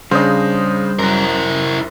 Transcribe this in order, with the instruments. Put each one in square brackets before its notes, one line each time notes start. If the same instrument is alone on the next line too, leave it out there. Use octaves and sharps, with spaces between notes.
[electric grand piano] C#3 D4 [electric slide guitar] G3 G#4 F5 [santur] C5 D#5
[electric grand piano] F#2 F#6 [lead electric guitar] E4 A#4